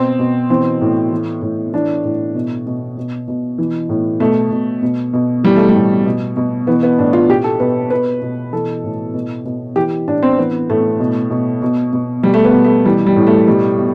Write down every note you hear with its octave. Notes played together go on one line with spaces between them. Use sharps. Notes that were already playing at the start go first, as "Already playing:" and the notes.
Already playing: B2 C4
B2
E3 C4
A2
E3
A2
E3 D4
A2
B2
B2
B2
B2
E3
A2
B2 A3
B2
B2
B2
E3 G3
A3
G3
A2
B2
B2
E3 B3
B3
A2 D4
F4
B2 G4
A4
B2 B4
B2 B4
B2
E3 A4
A2
B2
B2
E3 G4
A2 D4
C4
E3 B3
A2 A3
B2
B2
B2
B2
B2 G3
A3
B3
B2
A3
E3 G3
G3
A2
A3
B2 G3
B2